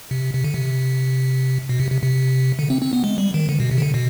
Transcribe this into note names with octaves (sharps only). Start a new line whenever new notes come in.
C3
C3
D3
C3
B2
C3
C3
C3
D3
C4
C4
B3
G#3
G3
D#3
D3
B2
C3
D#3
D3
B2